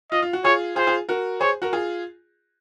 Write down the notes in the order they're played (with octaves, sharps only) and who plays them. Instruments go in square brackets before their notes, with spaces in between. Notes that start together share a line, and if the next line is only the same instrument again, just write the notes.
[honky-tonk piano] F4 [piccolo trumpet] D#5
[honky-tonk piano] F4
F#4
[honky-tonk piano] F4 G#4 [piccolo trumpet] C#5
[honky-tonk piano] F4 G#4 [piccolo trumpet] C5
[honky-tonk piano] F4 G#4
F#4 A#4
[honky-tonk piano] G#4 C5 [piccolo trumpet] C#5
[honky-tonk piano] F#4 A#4
F4 G#4